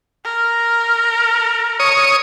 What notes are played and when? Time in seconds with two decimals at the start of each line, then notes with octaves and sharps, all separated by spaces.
0.24 A#4
1.80 C#5 D#6